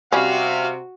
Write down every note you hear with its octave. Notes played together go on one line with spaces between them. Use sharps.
C3 G3 C#4 F#4 F5